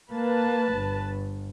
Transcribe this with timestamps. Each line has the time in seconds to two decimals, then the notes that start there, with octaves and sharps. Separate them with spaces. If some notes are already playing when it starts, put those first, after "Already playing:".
0.12 A#3 B4 A5
0.73 G1